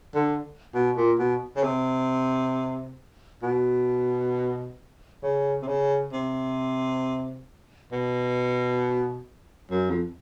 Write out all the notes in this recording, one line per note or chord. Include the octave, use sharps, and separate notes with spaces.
D3
B2
A#2
B2
C#3
C3
B2
C#3
C3
C#3
C3
B2
F#2
F2